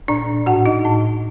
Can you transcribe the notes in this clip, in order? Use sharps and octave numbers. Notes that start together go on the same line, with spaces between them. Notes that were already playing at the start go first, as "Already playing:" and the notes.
A#2 D4 D5
A2 F#4 F#5
D#4 D#5
A2